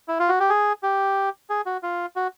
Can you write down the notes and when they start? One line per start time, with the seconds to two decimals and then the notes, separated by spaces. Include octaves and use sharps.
0.08 E4
0.20 F4
0.29 F#4
0.40 G4
0.49 G#4
0.83 G4
1.50 G#4
1.66 F#4
1.83 F4
2.16 F#4